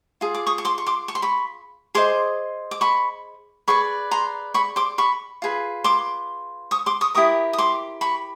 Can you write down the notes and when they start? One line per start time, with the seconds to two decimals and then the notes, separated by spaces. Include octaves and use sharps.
0.21 F4 G#4
0.35 D6
0.47 C#6 D#6
0.58 C#6
0.65 C6 D6
0.78 C#6
0.87 C6 D6
1.08 C#6
1.15 C6
1.22 B5 C#6
1.95 G#4 C5 D#5 C6 D6
2.71 D6
2.81 B5 C#6
3.68 G#4 B4 D5 B5 C#6
4.11 A#5 C6
4.54 B5 C#6
4.76 C6 D6
4.98 B5 C#6
5.42 F4 G#4 B4
5.84 C6 D6
6.71 C#6 D#6
6.86 C6 D6
7.01 C#6 D#6
7.15 E4 G4 A#4 C#6 D#6
7.53 D#6
7.58 C6 D6
8.01 B5 C#6